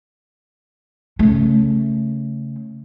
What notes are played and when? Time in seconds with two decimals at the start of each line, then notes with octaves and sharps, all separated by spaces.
1.19 C#3 A3